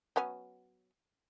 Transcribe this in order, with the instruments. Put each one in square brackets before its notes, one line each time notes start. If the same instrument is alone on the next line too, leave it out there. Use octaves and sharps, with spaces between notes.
[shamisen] F#3 B3 C#4